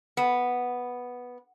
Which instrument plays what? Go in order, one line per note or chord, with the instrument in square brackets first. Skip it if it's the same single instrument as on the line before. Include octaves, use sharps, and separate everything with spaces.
[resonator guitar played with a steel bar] B3